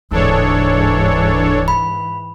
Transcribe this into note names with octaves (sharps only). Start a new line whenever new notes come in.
D1 G#2 E3 D4 A4 C#5
B5